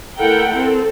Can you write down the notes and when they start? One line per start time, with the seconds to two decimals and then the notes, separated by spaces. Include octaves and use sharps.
0.18 A3 E4 A4 A#4 F#5 G5
0.57 C4 A4